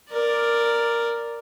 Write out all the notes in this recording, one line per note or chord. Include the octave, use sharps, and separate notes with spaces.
A#4 D5